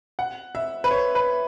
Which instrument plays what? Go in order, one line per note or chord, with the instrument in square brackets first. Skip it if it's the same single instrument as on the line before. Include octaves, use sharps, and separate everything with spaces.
[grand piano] F#5
E5
B4
C#5
B4